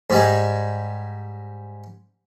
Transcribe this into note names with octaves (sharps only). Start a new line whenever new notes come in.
G#2 G3 G#3